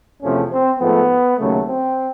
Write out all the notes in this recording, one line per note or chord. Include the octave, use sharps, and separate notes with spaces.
E2 C3 F3 A3 C#4
C4
G#2 F3 A3 B3
D#2 C#3 F#3 A3
C4